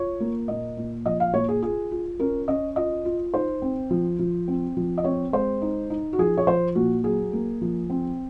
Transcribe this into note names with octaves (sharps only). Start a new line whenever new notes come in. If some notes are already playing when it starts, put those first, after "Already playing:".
Already playing: F4 C#5
A#3
A#2 D#5
A#2
F3 D#5
F5
A#2 C#5
G#4
F4 G#4
F4
C#4 A#4
C#4 D#5
F4 D#5
F4
D#4 C5
C4
F3
F3
C4
F3
D#5
C4 C#5
G#3 C5
D#4
D#4
F#4
F3 G#4
C#5
F3 C5
A#2 F#4
F#3 G#4
A#3
F3
C4